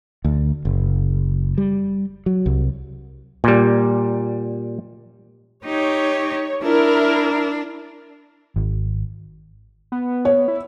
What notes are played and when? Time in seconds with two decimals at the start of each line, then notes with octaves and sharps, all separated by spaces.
0.25 D2
0.65 F#1
1.58 G3
2.26 F#3
2.46 C2
3.44 A#2 G3
5.65 D#4 G4 C#5
6.63 D4 E4 A#4
8.56 G#1
9.92 B3
10.25 C#5
10.48 E4